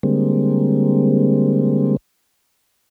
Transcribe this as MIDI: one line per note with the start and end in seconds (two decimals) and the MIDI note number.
0.03 1.97 50
0.03 1.97 55
0.03 1.97 56
0.03 1.97 58
0.03 1.97 60